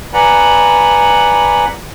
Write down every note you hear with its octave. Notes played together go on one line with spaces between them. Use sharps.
B4 D5 F#5 G#5 A#5 B5